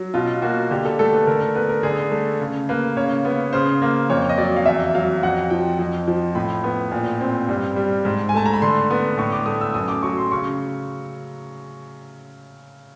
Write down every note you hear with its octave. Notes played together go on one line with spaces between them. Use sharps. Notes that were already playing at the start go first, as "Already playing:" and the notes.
Already playing: F#3
B2 F4
A#3 F#4
D3 G4
A4
A3 A4
B4
D3 A#4
A#4
B3 B4
A#4
D3 G#4
A3
C#3
A#3 B4
C#3 C#5
B3
C#3 C5
A#3
F2 C#5
D#5
F#3 D5
F5
E2 E5
F#3 F5
F2 F#5
F3 G5
F2
F3
A2 B5
B3
A#2
C4
G2
G3
G#2
G#5
A3 A5
A#5
B5
D3 C6
B3
A2 C#6
D6
A3 D#6
E6
F#2 D#6
D6
F#3 C#6
C6
C#3 C#6